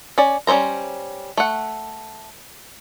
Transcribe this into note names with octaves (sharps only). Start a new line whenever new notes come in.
C#4 D5
G3 C#4 D#4 C5 A#5
A3 F#5